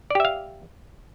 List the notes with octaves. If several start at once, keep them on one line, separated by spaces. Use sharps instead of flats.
G4 D5 E5 F5